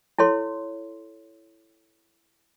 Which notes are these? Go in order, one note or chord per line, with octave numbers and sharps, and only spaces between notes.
E4 A4 C#5 C6